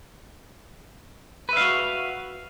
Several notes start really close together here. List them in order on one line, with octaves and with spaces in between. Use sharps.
B4 E5 F5 F#4